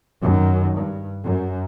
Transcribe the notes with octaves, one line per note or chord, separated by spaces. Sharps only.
F#2 D#3
G2
F#2